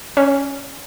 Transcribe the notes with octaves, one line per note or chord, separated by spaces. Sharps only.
C#4